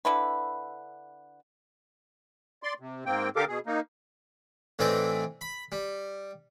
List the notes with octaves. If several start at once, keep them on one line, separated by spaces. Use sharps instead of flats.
D3 E4 B4
D5 C6
C3
G#2 A#3 C4 G5
D3 G4 A4 A#4 F5 D6
B2 G#4
A#3 D#4
A2 E3 C4 D#4 D5
B5
G3